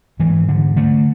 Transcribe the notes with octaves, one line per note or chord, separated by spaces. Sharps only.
G#2 E3
D3
D3 A3